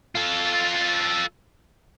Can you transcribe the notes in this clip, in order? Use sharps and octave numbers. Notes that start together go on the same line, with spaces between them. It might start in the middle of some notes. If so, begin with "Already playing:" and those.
F4 A4